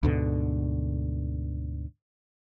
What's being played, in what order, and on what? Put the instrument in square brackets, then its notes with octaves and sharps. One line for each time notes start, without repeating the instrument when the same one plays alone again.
[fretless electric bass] D2 G#2 B2 D3